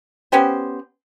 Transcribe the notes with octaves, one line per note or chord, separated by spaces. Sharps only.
B3 C#4 G4 C5